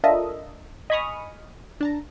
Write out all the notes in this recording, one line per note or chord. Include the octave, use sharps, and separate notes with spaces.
D4 F4 A4 A#4 D#5 E5
D#5 G#5 B5 C#6 D#6 F6
D4 A5 A#5